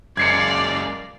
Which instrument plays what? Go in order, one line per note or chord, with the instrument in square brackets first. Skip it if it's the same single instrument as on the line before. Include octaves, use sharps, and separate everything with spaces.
[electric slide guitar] F#2 G#3 A#3 [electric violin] D5 F5 [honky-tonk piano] G#6 C7 C#7